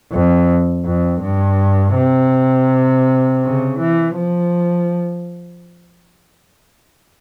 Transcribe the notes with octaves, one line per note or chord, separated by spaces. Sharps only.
F2
F2
G2
C3
C#3
E3
F3